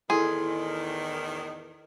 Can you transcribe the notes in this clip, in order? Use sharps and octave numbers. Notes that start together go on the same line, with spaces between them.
E2 A2 D#3 E4 G#4 A4 C6